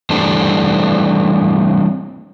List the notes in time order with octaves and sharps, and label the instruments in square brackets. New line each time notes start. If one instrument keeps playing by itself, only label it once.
[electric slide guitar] E3 G3 A3 C4 D4